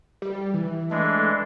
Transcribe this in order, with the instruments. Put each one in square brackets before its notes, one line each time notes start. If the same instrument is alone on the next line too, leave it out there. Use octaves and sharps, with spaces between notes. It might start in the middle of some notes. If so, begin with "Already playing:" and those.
[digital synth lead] G3
E3
[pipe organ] E3 G#3 D4 [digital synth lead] A3